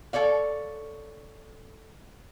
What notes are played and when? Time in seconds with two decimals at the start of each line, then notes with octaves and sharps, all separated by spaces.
0.13 A4 C#5 D5 F5